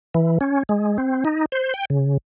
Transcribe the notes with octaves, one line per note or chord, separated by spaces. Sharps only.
E3
C#4
G#3
C4
D#4
C5
G5
C#3